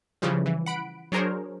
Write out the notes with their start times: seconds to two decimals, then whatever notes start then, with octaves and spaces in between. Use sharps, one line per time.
0.22 C#3 E3 F3 G3
0.46 E3
0.66 F#5 B5 D7
1.12 F#3 D4 G#4 A#4 C5 C#5